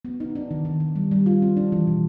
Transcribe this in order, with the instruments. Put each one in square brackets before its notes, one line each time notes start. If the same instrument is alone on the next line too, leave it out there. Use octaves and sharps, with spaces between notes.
[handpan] B3
D#4
D4
D#3
D#3
D#3
G3
G3
F4
C4
D4
E3
B2